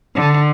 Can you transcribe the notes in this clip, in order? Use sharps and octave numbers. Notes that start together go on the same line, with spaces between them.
D3